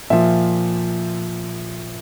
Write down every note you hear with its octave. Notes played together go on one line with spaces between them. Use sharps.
A#2 F3 E5